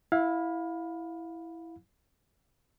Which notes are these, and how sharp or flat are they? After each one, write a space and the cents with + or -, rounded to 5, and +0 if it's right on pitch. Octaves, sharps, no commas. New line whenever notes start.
E4 +0 F5 +25 B5 +0